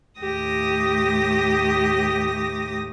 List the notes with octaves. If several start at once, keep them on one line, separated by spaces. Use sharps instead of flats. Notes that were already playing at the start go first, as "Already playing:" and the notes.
D#2 A2 G4 D#6 A#6